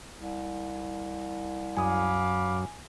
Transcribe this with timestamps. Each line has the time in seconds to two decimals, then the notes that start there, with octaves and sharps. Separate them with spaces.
0.15 C2
1.77 F#2 F5 G#5 B5 D6 D#6